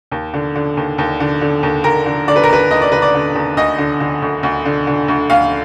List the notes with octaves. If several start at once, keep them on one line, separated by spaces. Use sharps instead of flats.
D#2
D3
D3
D#2
D#2
D3
D3
D#2
D#2 A#4
D3
D3 D5
B4
A#4
D#2 B4
D#2 D#5
D5
D3 B4
D5
D3
D#2
D2 D#5
D3
D3
D2
D2
D3
D3
D2
D2 F5